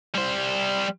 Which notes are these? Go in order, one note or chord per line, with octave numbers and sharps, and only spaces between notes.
G3 C5